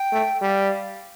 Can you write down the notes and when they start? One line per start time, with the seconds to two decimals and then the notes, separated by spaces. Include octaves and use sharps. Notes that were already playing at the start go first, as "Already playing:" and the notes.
Already playing: G5
0.13 A3
0.42 G3 F#5
0.48 F5